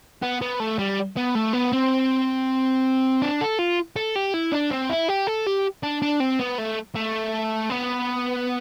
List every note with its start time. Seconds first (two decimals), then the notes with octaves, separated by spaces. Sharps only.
0.22 B3
0.42 B3
0.60 A3
0.79 G3
1.17 B3
1.35 A3
1.53 B3
1.72 C4
3.22 D4
3.41 A4
3.59 F4
3.96 A4
4.15 G4
4.34 E4
4.52 D4
4.71 C4
4.90 E4
5.09 G4
5.27 A4
5.47 G4
5.83 D4
6.02 D4
6.20 C4
6.39 B3
6.58 A3
6.96 A3
7.70 B3